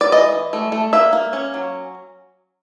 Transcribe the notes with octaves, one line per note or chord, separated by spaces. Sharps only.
D5
E3 D#5
E3
A3
A3
A#3 E5
A#3
C#4
F#3